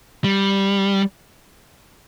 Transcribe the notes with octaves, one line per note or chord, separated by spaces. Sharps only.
G3